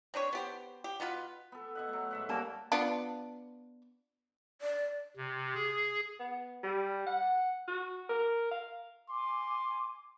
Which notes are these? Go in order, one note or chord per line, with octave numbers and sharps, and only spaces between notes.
C4 D4 B4 C#5
B3 G4 C5
G4
B2 B3 F4 B4
B3 A4
B2 E5 F#5
F#3 A3
G#2 E5 F#5
G3 A#3 C#4 A5
B3 D4 F4
D5
C3
G#4
B3
G3
F#5
F#4
A#4
F5
G#5 C6 D6